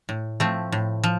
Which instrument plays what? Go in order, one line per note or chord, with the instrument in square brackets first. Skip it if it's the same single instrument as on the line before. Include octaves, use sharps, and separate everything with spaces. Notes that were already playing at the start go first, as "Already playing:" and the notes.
[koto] A2
F3 A3 C4
A2
F3